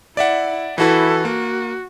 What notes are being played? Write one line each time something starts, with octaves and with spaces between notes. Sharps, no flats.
E4 D5 E5 F#5
E3 E4 F#4 A4 B4
A#3 F#4